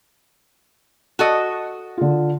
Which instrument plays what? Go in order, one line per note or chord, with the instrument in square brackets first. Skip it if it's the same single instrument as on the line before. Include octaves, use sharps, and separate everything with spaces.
[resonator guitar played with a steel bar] F#4 A4 D#5
[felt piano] D3 F4